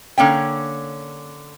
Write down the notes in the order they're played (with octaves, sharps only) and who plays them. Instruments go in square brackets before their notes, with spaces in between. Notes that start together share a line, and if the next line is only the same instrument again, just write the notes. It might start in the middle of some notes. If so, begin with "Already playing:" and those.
[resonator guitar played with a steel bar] D3 A#3 C#4 G5